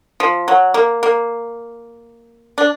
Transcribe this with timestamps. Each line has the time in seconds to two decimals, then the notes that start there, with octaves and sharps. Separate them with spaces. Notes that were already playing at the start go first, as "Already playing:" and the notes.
0.20 F3
0.48 F#3
0.74 A#3
1.03 A#3
2.58 D4